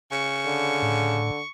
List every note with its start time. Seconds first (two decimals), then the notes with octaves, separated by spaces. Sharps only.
0.12 C#3 C#6
0.46 D3
0.82 A2